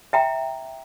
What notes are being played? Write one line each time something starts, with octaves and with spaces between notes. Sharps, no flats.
E5 G5 A#5